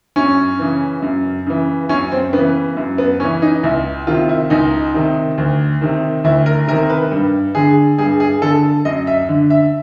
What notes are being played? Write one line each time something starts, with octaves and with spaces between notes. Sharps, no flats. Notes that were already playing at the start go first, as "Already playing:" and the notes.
F#2 C#4
C#3 E3
F#2
C#3 E3
F#2 C#4
C4
C#3 B3
E3
F#2
B3
C#3 E3 C#4
D#4
C#2 E4
C3 D#3 F4
E4
C#2 D#4
C3 D#3
D2
C3 D#3
D2 E4
A#4
C3 D#3 A#4
B4
G2
D3 G#4
G2 G#4
G#4
D3 A4
F#2 D#5
E5
D3
E5